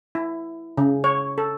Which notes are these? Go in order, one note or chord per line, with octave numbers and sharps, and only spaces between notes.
E4
C#3
C#5
A4